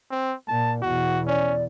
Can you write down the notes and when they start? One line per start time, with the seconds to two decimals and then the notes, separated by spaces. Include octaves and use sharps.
0.11 C4
0.48 A#2 A5
0.82 E2 B2 F#4
1.27 C#4 D5